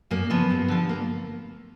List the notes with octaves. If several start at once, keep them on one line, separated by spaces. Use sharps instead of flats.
F#2 A#3
C#3 F3 B3
G2
D3 F3
A#3